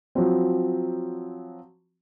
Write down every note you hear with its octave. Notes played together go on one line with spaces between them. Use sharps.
F3 F#3 C4